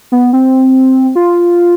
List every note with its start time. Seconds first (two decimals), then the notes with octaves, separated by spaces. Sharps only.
0.12 B3
0.33 C4
1.15 F4